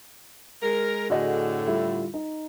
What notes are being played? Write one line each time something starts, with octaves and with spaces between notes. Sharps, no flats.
G#3 A#4
A2 D3 F#4 G#4 D#5
G3 E4 F4
D#4